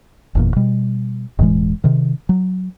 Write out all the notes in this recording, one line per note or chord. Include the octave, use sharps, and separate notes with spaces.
F#1 E2 A#2
B2 G3
E1 A2 E3 G#3
C3 D#3
F#3